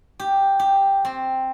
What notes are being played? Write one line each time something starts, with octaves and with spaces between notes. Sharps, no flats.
G4
G4
C4